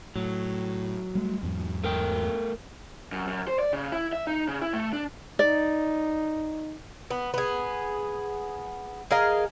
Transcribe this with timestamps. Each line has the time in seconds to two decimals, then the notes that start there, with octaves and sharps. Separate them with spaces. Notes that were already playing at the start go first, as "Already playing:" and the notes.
0.16 A2 F#3
1.15 G3 A3
1.43 E2 G#2 F#3
1.84 A3 A#4 G5
3.12 F#2
3.27 F#2
3.48 C5
3.59 D5
3.73 C#3
3.92 E4
4.13 E5
4.27 D#4
4.48 C#3
4.62 E4
4.73 A3
4.93 D4
5.39 D#4 D5
7.11 B3
7.34 B3 G#4
9.11 G#4 A#4 D#5 F5